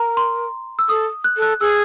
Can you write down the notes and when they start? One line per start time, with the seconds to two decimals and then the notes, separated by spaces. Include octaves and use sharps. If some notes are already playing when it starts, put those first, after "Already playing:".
Already playing: A#4 A#5
0.17 C6
0.79 E6
0.89 A4 D#6
1.24 F#6
1.37 A4
1.42 F#6
1.60 G#4 E6